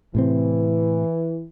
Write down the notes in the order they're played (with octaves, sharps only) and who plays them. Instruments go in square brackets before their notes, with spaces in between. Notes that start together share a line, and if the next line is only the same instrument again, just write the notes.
[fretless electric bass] A2 C3 C4 [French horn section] E3